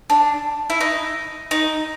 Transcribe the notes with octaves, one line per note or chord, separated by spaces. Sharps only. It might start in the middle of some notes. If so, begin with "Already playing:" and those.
D4
E4
D#4
D#4